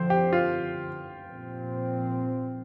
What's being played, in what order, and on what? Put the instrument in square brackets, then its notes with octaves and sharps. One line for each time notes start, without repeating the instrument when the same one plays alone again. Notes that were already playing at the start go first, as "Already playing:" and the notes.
Already playing: [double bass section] D3 F3 C4 [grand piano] C5
[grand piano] G4
F4
[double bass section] A#2 F3 C4